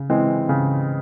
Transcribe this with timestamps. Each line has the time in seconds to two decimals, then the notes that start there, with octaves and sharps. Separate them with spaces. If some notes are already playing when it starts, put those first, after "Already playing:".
Already playing: C#3
0.10 E3 G#3 C4
0.49 C#3